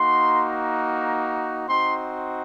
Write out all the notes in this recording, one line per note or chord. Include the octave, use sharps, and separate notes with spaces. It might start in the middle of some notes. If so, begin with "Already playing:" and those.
Already playing: A#3 D#4 F#4 C6
C4 D#4 F#4 C6